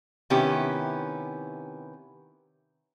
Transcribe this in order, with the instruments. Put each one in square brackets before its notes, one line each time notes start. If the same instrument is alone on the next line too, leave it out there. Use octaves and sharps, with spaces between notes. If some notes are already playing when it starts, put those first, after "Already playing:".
[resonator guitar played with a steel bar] C3 D#3 B3 C#4 E4 G4